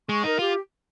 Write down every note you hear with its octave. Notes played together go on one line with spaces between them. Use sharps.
G#3 C#6
D#4 A#4
F4 G4